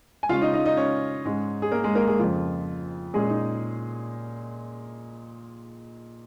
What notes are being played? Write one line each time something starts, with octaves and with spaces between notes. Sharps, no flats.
G#5
C#3 G#3 C#4 F4 F5
D#4 D#5
D#4 D#5
D#4 D#5
C#4 C#5
G#2 G#3 C#4
G#4
A#3 A#4
G#3 G#4
A#3 A#4
G#3 G#4
F2 C#3 F3 F4
A#2 G#3 C#4 G#4
D#4